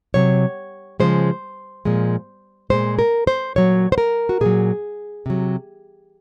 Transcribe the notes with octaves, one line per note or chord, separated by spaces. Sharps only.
C3 F#3 C#5
C#3 F3 G#3 C5
A#2 F3 G#3
A#2 G#3 C5
A#4
C5
A#2 F#3 C#5
C5
A#4
F#4
A#2 F#3 G#4
C3 F#3